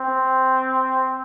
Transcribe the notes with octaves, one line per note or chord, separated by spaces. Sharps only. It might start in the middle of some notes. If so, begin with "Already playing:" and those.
Already playing: C4